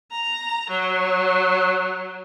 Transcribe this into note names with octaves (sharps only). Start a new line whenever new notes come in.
A#5
F#3